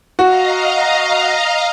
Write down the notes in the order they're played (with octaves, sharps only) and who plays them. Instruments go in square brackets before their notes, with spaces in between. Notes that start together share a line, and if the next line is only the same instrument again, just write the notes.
[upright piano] F#4 [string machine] D#5 F5 A#5